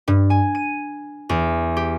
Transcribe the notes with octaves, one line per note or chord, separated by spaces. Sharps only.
G2
G#5
D#7
E2
G4